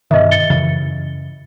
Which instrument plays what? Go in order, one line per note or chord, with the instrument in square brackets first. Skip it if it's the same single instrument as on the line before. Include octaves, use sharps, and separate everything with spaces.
[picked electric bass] G2 B2 D#3 [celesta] D#5 E5
[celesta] A6 C#7 G7
[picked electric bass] F#2 C#3 E3